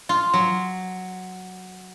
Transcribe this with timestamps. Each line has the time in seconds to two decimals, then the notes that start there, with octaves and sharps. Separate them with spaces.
0.09 F4
0.34 F#3